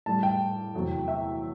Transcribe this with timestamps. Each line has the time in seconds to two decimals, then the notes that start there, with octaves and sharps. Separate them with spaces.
0.06 A2 G3 A5
0.23 G5
0.74 E2 C3 F#3 A3
1.08 E5